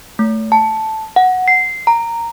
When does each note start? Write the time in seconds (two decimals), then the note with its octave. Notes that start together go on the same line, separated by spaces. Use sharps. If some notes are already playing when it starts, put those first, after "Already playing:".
0.19 A3
0.52 A5
1.16 F#5
1.48 C7
1.87 A#5